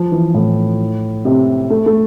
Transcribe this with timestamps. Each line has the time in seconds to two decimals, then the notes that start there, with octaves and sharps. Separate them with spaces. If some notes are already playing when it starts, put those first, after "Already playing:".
Already playing: F3
0.12 E3
0.34 A2
1.25 C3
1.70 A3
1.86 A3